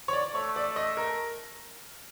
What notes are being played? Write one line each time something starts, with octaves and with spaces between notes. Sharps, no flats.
C#5
D5
A3 C#5
D5
D#5
A#4